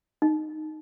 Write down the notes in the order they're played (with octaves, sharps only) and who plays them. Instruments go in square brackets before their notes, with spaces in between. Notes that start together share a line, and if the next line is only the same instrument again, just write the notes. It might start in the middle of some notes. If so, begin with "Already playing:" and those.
[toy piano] D#4